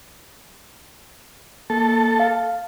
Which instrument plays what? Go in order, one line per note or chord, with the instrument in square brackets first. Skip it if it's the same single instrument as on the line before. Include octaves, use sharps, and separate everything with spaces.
[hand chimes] A#3 [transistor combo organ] A4
[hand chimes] F5